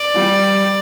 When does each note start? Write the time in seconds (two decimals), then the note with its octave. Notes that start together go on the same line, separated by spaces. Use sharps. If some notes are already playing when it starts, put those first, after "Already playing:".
Already playing: D5
0.14 G3